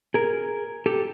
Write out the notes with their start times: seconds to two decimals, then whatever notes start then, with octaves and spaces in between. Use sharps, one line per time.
0.14 G#4 A#4
0.86 G4 A4